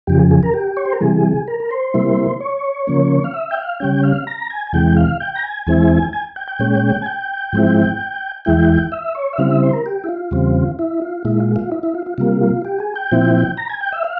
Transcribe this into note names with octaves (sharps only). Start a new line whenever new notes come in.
F2 C#3 F3 G4
G#4
G#4
A#4
G4
C#5
C5
A#4
C3 E3 G3 G#4
A#4
A#4
C5
C3 G3 A#3 E4
C#5
C#3 F3 A#3 C#4
F5
E5
G5
F5
C#3 G3 C#4 G5
F5
A#5
G#5
G#5
E2 C3 E3 G#3 G5
F5
G5
A#5
G#5
E2 E3 G#3 C4 E4 G#5
G#5
G5
G5
A#2 G#3 C#4
G#5
G5
G#2 F3 G#3 C4 E4
E2 E3 G#3 E4 G5
E5
C#5
E5
C#3 G3 C4 E4 F5
E5
C5
A#4
G4
E4
F4
E2 C#3 G3 C4
E4
F4
A#2 G#3 E4
F4
F4
E4
E4
F4
F4
C3 G3 A#3 F4
F4
G4
G#4
G5
A#2 F3 C4 E4
A#5
G#5
G5
E5
F5